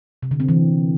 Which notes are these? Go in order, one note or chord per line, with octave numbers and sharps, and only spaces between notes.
C3
D3
C4
E3